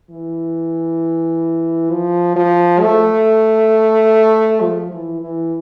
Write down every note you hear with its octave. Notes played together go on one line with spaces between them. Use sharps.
E3
F3
F3
A3
F3
E3
E3